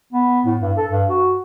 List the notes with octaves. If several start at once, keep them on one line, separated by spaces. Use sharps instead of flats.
B3
A2
G2
A4
G2
F#4